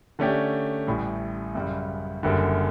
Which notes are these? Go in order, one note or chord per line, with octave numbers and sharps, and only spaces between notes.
D3 A3 C#4 G4 D5
A1 A2 G3
F#2 C#3 G3
F#1 F#2 D3 G3